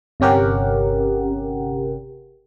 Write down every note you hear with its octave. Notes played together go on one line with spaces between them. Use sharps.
G1 C3 C#4 G4 A#4 F#5